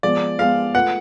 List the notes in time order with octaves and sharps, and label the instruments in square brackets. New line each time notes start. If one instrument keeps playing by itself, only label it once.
[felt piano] F3 G#3 B3 [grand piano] D5
[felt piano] F3 G#3 B3 [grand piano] F5
[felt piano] A3 F4 B4 [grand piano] F#5